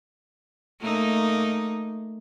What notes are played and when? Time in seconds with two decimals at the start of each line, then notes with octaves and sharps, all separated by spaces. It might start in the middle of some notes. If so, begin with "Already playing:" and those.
0.80 A3 A#3 D#4